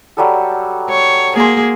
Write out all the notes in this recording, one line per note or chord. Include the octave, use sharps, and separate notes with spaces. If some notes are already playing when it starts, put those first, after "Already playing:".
F#3 G3 A4
C#5
A#3 G#4 G#5 C6